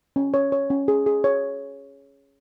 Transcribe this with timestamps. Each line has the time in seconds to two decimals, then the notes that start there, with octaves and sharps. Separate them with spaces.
0.16 C#4
0.34 C#5
0.52 C#5
0.70 C#4
0.88 G#4
1.06 G#4
1.24 C#5